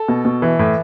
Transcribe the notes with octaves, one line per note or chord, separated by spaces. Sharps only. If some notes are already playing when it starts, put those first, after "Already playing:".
Already playing: A4
B2
B2
E3
A2